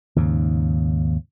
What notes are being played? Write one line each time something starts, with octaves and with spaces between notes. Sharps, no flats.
D#2 G#2 C#3